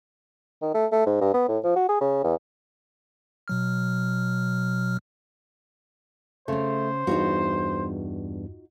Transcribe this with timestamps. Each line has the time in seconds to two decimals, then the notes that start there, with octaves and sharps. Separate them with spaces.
0.62 D#3
0.75 A3
0.92 A3
1.07 G#2
1.21 G2
1.34 B3
1.48 A2
1.64 F3
1.76 F#4
1.89 G#4
2.01 C#3
2.24 E2
3.48 B2 F#3 F6
6.48 C#3 A3 C#4 C5
7.07 E2 G2 D#4 F4 F#4